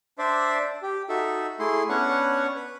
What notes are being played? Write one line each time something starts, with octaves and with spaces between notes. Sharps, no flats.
D4 C5 D5 E5
G4
D#4 F#4 A4 E5
A3 E4 G#4 C6
B3 C#4 D4 C#5 F#5 C#6
B4